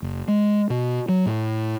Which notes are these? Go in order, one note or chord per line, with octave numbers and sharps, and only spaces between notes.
F#1
G#3
B2
F#3
A2